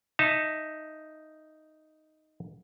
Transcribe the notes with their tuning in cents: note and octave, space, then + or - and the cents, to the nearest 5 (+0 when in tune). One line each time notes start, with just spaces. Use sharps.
D#4 +0 E5 +0 A5 +20